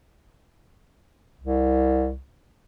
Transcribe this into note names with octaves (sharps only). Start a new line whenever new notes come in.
C2